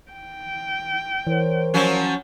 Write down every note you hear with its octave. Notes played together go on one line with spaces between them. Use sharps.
G5
E3 A#4 C5 C#5
F3 F#3 C#4